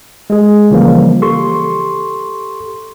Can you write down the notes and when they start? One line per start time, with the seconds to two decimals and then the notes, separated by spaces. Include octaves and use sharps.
0.30 G#3 G#4
0.71 C#3 E3 F3 G3 A#3
1.22 G4 A4 C6 C#6